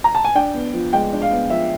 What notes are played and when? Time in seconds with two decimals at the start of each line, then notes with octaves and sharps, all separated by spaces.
0.04 A#5
0.15 A5
0.25 G#5
0.35 D4 G5
0.54 B3
0.73 F3
0.93 G#3 G5
1.12 D4
1.22 F5
1.31 B3
1.50 F3 E5